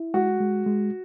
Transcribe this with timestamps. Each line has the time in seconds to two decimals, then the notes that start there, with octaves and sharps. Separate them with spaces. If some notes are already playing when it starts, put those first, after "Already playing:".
Already playing: E4
0.14 G#3 F#4
0.41 G#3
0.66 G#3